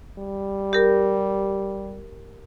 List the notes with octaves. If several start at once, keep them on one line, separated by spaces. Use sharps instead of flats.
G3
G4 A#4